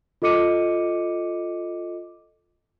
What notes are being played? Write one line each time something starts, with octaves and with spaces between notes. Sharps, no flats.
F4 A4 D#5 D6 C#7 D#7